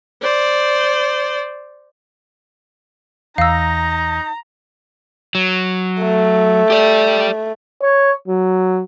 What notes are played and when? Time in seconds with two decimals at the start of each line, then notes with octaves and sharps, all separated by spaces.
0.22 C5 D5
3.38 E2 D#4 F5 A#5 E6
5.35 F#3
6.01 A3
6.70 G4 D5
7.82 C#5
8.28 F#3